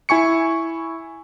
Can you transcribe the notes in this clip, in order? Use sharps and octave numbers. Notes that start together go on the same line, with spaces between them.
E4 G#5 C#6 C#7